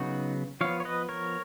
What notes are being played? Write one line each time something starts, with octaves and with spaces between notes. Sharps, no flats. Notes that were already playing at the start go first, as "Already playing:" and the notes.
Already playing: C#3 F#3 B3 D#4 F#4
F3 B3 C#5 F5
C#5
B4 D#5
A#4 C#5